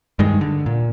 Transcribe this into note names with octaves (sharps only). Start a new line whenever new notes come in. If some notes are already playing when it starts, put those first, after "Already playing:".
G2 D#3 G#3
D3
A#2